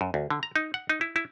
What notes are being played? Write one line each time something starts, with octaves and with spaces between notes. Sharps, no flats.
F#2
D2
D3
A#5
D#4
F#5
D#4
E4
E4